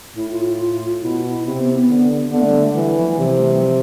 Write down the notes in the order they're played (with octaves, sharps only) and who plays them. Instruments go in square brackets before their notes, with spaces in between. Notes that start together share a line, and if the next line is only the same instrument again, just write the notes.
[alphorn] A2 [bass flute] E4
[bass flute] F4
F4
[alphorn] B2 [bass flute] E4
[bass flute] E4
[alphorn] C3 [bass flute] C4
[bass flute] B3
B3
[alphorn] D3
[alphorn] D3 [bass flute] B3
[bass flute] A3
G3
A3
[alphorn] E3 [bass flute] G3
[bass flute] F3
F3
[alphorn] C3 [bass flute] E3
[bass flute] A3
G3
F3